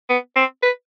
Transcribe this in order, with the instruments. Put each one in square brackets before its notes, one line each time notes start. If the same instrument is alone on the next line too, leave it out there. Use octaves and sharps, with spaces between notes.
[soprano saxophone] B3
C4
B4